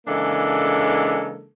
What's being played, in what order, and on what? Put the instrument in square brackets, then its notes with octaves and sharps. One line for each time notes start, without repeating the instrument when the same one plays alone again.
[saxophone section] C#3 E3 G#3 A#3 D4 A4